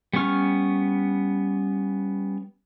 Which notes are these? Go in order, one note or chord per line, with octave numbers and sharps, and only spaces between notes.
G3 B3 C#4 C#6 F6